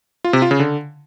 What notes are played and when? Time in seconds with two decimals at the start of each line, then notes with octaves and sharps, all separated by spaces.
0.24 F4
0.33 C3
0.42 F4
0.51 C#3
0.60 D3